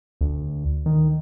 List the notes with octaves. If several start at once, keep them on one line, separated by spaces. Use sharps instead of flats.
D2
D#3